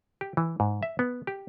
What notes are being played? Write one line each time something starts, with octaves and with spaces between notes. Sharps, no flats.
G4
E3
G#2
E5
B3
G4